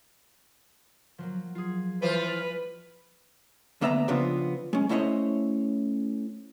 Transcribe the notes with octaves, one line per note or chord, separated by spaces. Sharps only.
F3 F#3 A#3
F4 G#4
E3 G3 F4 B4 C5
D2 A#3 B3 E5 A5 A#5
C#3 F3 B3 C4 D4 F4
G#3 C#4
A3 C#4 E4 C5 C#5 D#5